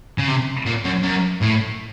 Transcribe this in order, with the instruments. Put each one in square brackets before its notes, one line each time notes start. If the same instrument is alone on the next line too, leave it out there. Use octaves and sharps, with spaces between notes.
[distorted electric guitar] C#3
C3
A#2
F#2
F#2
A2